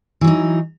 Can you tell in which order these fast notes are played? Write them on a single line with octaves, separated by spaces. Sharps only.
E3 F#3 D#4